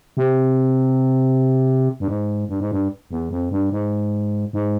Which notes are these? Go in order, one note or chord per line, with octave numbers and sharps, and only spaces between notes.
C3
G2
G#2
G2
G#2
G2
E2
F2
G2
G#2
G#2